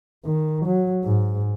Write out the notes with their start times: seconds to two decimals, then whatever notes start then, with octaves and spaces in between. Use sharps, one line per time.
0.25 D#3
0.66 F#3
1.04 G#2